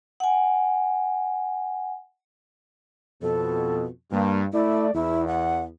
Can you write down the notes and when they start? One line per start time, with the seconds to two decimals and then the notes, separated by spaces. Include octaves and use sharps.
0.20 F#5 G#5
3.22 F2 B2 A4
4.11 G2 A#3
4.53 A3 E4 D5
4.94 E2 E4
5.27 F#5